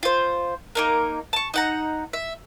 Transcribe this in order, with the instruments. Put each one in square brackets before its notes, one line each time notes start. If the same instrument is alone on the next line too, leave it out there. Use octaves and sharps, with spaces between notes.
[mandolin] F4 C5
A#3 D#4 A#4
A5 C#6
D#4 F#5 A#5
E5